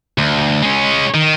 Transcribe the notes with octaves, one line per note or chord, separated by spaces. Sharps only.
D2
G#3 C#4
D#3